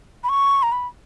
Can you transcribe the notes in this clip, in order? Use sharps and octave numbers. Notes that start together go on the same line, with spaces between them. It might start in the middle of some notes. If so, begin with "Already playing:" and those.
B5
C#6
A#5
B5